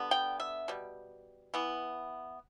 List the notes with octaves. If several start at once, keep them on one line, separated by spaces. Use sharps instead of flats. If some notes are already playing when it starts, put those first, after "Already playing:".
Already playing: D3 G3 B3
G5
E5
B2 G3
E3 B3